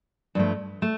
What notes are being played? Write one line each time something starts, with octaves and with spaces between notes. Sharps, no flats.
G2 F3 A3
A3